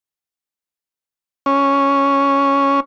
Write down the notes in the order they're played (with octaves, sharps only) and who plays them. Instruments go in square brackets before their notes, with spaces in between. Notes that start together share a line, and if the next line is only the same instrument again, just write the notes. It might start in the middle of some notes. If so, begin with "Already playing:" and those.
[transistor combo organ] C#4